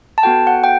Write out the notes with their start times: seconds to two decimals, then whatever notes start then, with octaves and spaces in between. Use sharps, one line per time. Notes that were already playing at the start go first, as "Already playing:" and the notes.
0.18 A5
0.23 B3 F#4 A4 G5
0.47 F#5
0.64 G5